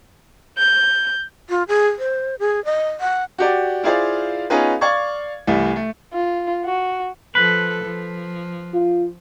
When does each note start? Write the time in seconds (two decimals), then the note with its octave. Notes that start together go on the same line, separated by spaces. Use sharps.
0.58 G6
1.49 F4
1.68 G#4
1.99 C5
2.39 G#4
2.65 D#5
3.00 F#5
3.38 F#4 G4 D5
3.83 E4 F4 G#4 C5 D5 F5
4.50 B3 C#4 D#4 F4 G#4 B4
4.81 D5 F5 C#6 G#6
5.47 C2 E3 G3 A3
5.76 A3
6.13 F4
6.65 F#4
7.35 F3 A4 B4
7.84 F3
8.74 F4